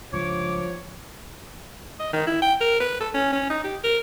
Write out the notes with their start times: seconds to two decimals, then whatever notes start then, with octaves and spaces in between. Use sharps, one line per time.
0.13 C#2 G2 F3 C#5 D6
2.00 D#5
2.13 D#3
2.27 E4
2.42 G5
2.61 A#4
2.81 B4
3.01 A4
3.14 C#4
3.33 C#4
3.50 D#4
3.64 G4
3.84 A#4